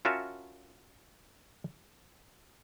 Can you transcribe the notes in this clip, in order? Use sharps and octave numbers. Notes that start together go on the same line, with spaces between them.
C#4 F4 F#4 A#4 E5 A5